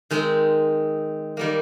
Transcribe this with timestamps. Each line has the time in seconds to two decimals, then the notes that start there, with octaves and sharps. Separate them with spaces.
0.11 D#3 G#3 C4
1.37 D#3 G3 A#3